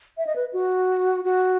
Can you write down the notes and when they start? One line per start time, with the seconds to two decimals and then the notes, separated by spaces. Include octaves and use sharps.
0.18 E5
0.27 D#5
0.36 B4
0.53 F#4
1.25 F#4